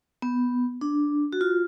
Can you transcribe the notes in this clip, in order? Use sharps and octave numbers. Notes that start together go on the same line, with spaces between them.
B3
D4
F#4
F4